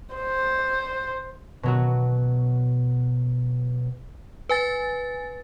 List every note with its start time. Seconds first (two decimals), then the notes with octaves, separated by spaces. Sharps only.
0.15 C5
1.63 B2 F#3 F#4
4.49 B4 G#5 A6